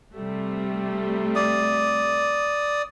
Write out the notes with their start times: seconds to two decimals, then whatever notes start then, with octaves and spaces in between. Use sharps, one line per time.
0.13 C3 G3 A3
1.35 D5 D#6